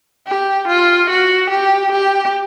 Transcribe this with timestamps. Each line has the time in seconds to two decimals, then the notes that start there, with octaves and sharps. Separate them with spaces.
0.28 G4
0.68 F4
1.10 F#4
1.50 G4
1.92 G4